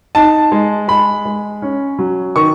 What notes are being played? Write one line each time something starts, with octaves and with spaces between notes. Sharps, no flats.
D#4 A5
G#3
G#3 B5
G#3
C#4
F#3
D#3 C#6